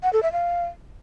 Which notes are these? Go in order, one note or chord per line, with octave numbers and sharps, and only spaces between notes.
F#5
A4
E5
F5